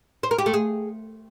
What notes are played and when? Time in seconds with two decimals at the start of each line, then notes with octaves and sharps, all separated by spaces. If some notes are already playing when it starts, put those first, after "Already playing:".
0.23 C5
0.31 A#4
0.38 G4
0.46 A3
0.54 G#4